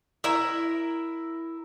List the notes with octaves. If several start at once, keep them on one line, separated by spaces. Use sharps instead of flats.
E4 A#4 E5